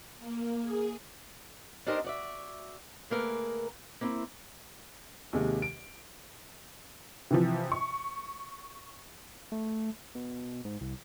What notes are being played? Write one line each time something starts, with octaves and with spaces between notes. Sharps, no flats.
A#3
G#4
D4 D#4 G4 A#4 C5 D#5
F#4 D5 E5
D3 A3 A#3 G#4 A#4 B4
A#3 C4 E4
D#2 C3 G#3
D7
C3 E3 F3
C#6
A3
B2
G#2
C2